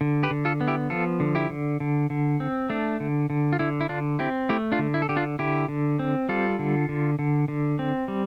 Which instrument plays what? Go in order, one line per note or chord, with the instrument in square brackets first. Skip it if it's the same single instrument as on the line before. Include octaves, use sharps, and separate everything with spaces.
[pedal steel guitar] D3
G4 B4
D3
F4 A4
B3
E4 G4
F3 F4 A4
D3
E4 G4
D3
D3
D3
C4
A3 D4
D3
D3
F4
D3 E4
E4
D3 D4 F4
C4 E4 G4
A3 E4 G4
D4 F4
D3
E4
A4
D3 G4
D4 F4
D3 E4 G4
D3
C4
G3 F4 A4
D3
D3
D3
D3
C4
G3